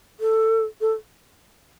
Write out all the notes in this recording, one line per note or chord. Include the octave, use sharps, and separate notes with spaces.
A4
A4